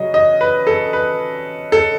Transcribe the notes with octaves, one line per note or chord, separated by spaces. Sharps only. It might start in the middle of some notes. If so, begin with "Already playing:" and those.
Already playing: C#3 F#3 C#4 D#5
D#5
B4
A4
B4
A4